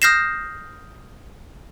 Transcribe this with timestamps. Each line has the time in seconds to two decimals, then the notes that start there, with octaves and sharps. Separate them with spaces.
0.02 D#6 F6 G6 A#6 C7 E7